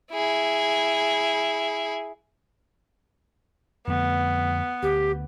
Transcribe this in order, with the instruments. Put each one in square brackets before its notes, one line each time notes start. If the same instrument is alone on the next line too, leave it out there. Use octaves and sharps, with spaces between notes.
[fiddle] E4 G#4
[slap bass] F2 D3 A3 [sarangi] B3
[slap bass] D2 [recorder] G4